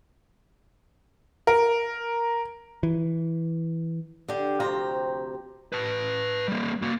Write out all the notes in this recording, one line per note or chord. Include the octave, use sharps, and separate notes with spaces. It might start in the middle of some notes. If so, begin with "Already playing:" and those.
A#4
E3
D3 D4 G4
D2 C3 F3 C4 G5 A#5
B4 A5
G3 A#3
A#3 F#4